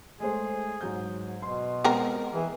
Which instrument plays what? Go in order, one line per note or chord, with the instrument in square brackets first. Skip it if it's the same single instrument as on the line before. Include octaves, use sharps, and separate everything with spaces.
[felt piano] G#3 A3 C5 [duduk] G#4
[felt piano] G#2 F#3 G6
[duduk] B2 [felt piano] C6
[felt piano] G#3 [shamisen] B3 C4 A#4
[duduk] E3 [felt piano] G#4